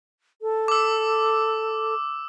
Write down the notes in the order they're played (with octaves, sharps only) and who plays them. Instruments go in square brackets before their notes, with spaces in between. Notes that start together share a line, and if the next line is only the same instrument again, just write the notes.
[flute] A4
[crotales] D6 E6